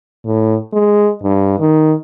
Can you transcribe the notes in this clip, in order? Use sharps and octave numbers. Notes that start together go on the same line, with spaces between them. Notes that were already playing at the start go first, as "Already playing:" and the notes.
A2
G#3
G2
D#3